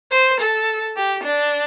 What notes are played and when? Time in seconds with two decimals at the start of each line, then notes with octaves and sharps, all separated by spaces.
0.11 C5
0.40 A4
0.97 G4
1.24 D4